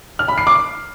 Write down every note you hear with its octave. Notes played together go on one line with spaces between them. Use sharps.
F6
B5
C7
D6